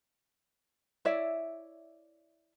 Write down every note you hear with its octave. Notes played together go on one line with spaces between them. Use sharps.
E4 C#5 D5 E5